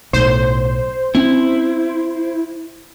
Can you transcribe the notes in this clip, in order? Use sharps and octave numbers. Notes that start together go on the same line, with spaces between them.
B1 A2 C5
C4 C#4 E4